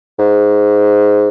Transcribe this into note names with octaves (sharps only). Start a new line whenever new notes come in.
G#2